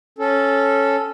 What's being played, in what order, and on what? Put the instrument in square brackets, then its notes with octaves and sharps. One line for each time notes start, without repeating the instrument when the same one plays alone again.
[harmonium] C#4 A4